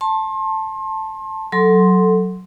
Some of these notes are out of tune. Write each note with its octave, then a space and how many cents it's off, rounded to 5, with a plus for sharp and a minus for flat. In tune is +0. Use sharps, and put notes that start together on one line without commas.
A5 +0 C6 +35
F#3 +0 A4 +0 C6 +0